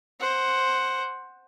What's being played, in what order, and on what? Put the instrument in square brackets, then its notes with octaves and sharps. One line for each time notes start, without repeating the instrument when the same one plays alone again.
[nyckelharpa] C5 F#5